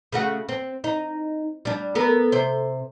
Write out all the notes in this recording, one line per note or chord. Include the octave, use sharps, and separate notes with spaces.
C#3 A3 F#4
C4
D#4
G3 D4
B3 A4 A#4
C3 C5